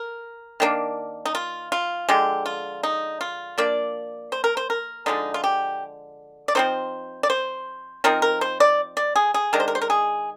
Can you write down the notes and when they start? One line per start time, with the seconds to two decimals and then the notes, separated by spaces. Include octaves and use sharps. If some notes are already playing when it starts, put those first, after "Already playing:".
Already playing: A#4
0.60 D#3 A#3 D4
1.25 D#4
1.35 F4
1.72 F4
2.09 D3 F3 G#3 G4
2.46 F4
2.83 D#4
3.21 F4
3.58 F3 A#3 D4 D5
4.32 C5
4.44 A#4
4.57 C5
4.70 A#4
5.06 D3 F3 G#3 D#4
5.34 F4
5.44 G4
6.48 D5
6.55 F3 C4 D#4 C5
7.23 D5
7.30 C5
8.04 F3 C4 D#4 A#4
8.22 A#4
8.41 C5
8.60 D5
8.97 D5
9.16 G#4
9.34 G#4
9.53 D#3 G#3 D4 A#4
9.60 C5
9.68 A#4
9.75 C5
9.82 A#4
9.90 G#4